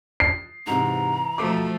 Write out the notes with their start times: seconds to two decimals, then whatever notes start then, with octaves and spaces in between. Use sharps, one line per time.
0.20 C7
0.67 G#2 C3 E3 A#5
1.38 B2 F3 A3 A4 D6